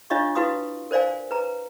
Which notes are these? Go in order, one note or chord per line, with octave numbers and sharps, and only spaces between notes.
D4 F4 C#5 D#5 F5 C#6
E4 F#4 B4 F5 C6 D#6
A#4 C5 D5 F5 G#5
B4 A#5